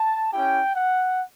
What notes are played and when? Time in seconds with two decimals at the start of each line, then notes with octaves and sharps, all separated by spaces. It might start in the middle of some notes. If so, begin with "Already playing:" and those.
Already playing: A5
0.31 C#4 E4 G4 G5
0.75 F#5